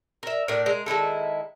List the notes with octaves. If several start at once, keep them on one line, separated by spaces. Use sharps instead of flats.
A#4 E5
A2 D4 A#4 D5
G#3 A#4
D#3 G#3 E4 A4